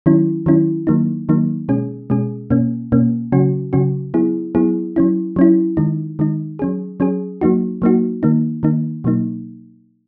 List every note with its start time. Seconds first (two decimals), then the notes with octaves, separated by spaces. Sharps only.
0.06 D#3 F#3 C#4 E4
0.46 D#3 F#3 C#4 E4
0.87 D#3 F#3 A#3 D#4
1.29 D#3 F#3 A#3 D#4
1.69 B2 G#3 C#4 G#4
2.10 B2 G#3 C#4 G#4
2.50 B2 A#3 C#4
2.92 B2 A#3 C#4
3.32 C#3 F#3 C#4 F#4
3.73 C#3 F#3 C#4 F#4
4.14 F#3 B3 E4 G#4
4.55 F#3 B3 E4 G#4
4.96 F#3 C#4 E4
5.36 F#3 C#4 E4
5.77 D#3 G#3 D#4
6.19 D#3 G#3 D#4
6.59 F#3 C#4 G#4
7.00 F#3 C#4 G#4
7.41 F#3 A#3 D#4 F#4
7.82 F#3 A#3 D#4 F#4
8.23 D#3 A#3 D#4
8.63 D#3 A#3 D#4
9.04 B2 F#3 A#3 D#4